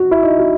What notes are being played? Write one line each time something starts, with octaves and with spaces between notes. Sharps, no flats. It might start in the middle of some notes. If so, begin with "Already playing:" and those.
Already playing: F#4
E4
D#4
F#4